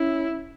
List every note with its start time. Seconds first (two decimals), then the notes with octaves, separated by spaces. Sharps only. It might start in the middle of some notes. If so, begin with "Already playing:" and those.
Already playing: C#4 E4